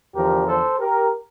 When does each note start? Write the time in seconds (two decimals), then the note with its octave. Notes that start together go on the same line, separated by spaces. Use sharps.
0.14 E2 D3 F3 G4 A#4
0.47 A4 C5
0.79 G4 A#4